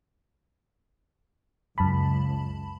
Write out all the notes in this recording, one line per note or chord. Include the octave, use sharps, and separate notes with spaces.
C#2 F#2 A5 B5